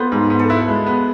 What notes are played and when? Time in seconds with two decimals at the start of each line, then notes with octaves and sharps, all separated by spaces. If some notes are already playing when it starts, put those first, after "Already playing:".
Already playing: B3 F4 A4 C5
0.12 G#2
0.30 B3
0.39 A4
0.50 E4 B4
0.68 G#3
0.86 B3